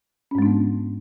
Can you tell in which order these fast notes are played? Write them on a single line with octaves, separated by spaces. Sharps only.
C#4 G#2 G#3 D4 B3